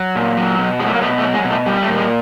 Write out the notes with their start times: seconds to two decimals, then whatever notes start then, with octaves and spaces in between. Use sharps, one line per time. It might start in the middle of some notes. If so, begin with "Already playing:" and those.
Already playing: F#3
0.16 A#2
0.37 F#3
0.59 B2
0.80 F#3 G#3
0.87 A3
0.94 A#3
1.01 B2 A3 B3
1.18 A3
1.23 F#3
1.34 G#3
1.45 B2
1.50 A3
1.66 G3
1.82 A3
1.88 A#2
1.98 G#3